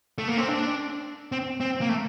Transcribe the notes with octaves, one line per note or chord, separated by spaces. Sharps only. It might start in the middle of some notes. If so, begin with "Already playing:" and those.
A3
A#3
C4
D4
C4
C4
A#3
A3